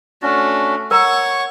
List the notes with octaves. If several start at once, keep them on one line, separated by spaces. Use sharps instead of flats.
A3 C#4 D4 F#4
A#4 C#5 F#5 A#5 C#6 E6